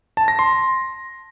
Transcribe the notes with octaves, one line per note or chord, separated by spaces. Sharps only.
A5
A#6
C6